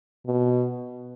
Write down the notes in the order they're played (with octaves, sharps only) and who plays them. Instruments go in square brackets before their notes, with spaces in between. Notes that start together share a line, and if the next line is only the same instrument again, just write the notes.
[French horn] B2